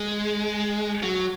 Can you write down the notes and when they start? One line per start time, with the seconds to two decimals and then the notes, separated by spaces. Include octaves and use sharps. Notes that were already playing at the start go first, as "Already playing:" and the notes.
Already playing: G#3
1.03 F#3